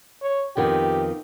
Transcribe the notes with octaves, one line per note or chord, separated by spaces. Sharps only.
C#5
F2 D#3 B3 G4